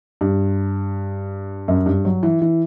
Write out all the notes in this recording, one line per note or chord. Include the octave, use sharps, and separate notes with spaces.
G2
F#2
G2
F#3
E3
E3